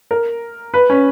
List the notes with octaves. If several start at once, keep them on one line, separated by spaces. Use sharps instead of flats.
A#4
B4
C#4